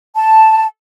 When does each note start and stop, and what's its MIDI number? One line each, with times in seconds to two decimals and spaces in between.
0.16 0.65 81